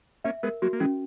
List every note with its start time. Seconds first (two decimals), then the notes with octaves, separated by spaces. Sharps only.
0.24 A#3 C#4 E5
0.43 G#3 B3 A#4
0.62 F#3 A#3 F#4
0.73 A#3
0.80 E3 G#3 C#4